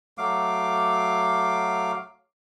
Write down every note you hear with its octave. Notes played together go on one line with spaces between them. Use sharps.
F#3 A3 F5 D6